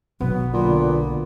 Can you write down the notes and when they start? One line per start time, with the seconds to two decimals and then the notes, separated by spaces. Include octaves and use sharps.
0.21 B1 F#3 B3
0.53 A#2 D3